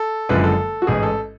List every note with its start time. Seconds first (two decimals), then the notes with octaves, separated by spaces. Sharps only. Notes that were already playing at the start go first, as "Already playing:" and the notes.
Already playing: A4
0.29 F#1 F#2 D3 F3 G#3 B4
0.44 A4
0.82 F#4
0.87 A1 G#2 G#3 G#4
1.03 A4